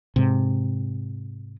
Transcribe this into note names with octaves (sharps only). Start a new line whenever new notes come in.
G#2 C3